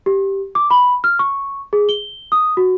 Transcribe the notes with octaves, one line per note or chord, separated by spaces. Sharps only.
G4
D6
B5
F6
C#6
G#4
G7
D#6
F#4